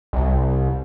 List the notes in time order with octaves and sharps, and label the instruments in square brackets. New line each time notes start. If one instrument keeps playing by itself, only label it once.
[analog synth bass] C2